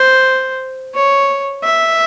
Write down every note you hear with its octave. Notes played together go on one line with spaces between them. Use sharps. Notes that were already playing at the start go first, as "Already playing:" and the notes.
Already playing: C5
C#5
E5